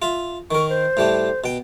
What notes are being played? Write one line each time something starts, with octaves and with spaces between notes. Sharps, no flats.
F4 E5
D#3 A#4 C#6
C5
A2 G3 A3
B2 G5